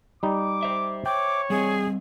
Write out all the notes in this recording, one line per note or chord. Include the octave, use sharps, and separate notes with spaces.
G3 D#4 D6
C5 E5
C#5 G5 D6
G3 C4 G#4 D#5